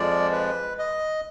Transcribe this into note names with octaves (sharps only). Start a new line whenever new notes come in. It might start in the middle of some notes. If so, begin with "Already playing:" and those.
Already playing: F2 F3 G#3 D5
B4
D#5